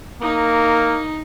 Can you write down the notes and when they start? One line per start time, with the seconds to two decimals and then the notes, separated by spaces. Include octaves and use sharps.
0.21 A#3 D#4